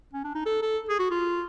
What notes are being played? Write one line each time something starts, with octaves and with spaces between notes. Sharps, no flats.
C#4
D4
D#4
A4
A4
G#4
F#4
F4